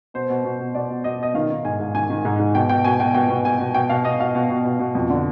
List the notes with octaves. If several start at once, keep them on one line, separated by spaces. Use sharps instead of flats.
B2 C5
B2
B2
B2
B2 D5
B2
B2 D#5
B2 D#5
D#3 F5
D#3
G#2 G#5
G#2
D#3 G#5
D#3
G#2
G#2
B2 G5
B2 G5
B2 G#5
B2 G5
B2 G5
B2
B2 G#5
B2
B2 G5
B2 F5
B2 D#5
B2 F5
B2
B2
B2
B2
F2
D3